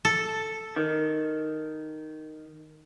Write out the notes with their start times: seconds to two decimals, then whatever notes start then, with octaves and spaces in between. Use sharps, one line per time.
0.05 A4
0.76 D#3